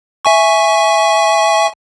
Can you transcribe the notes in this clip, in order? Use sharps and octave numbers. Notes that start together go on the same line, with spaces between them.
E5 G#5 C#6